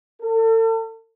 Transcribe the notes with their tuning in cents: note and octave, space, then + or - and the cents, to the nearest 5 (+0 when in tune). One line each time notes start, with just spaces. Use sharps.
A4 +40